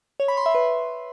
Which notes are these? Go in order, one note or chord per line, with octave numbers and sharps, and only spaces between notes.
C#5
B5
C6
E5
B4